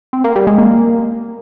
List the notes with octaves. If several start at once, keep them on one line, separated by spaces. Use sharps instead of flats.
C4
A#3
G3
G#3
A#3